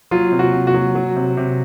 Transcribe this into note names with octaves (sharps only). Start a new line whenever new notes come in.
F#3 F4
C3
F#4
C3
F#4
F#3
F#3
C3
C3